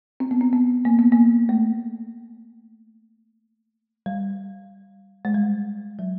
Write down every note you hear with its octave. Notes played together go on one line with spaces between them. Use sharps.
C4
B3
C4
B3
A#3
B3
A#3
A3
G3
G#3
G3
F#3